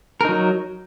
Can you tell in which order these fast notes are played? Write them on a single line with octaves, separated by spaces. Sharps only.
A#4 D#4 F#3